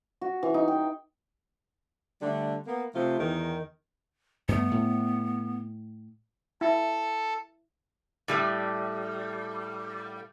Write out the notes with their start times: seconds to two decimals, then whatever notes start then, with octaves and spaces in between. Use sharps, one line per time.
0.21 F#4
0.43 E3
0.54 D#4
0.68 G5
2.21 D3 G3 A3 D4
2.67 A#3 B3
2.95 C3 F3 A3 F4
3.19 E2 D#3
4.48 G2 A3 B3
4.71 A2
6.61 E4 A4
8.28 A2 G3 A3